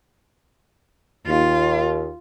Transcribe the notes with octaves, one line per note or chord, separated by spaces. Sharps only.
D#2 F4